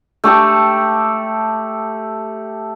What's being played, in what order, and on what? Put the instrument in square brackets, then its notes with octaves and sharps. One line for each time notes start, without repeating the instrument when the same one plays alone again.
[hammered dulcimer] A3 G4 A4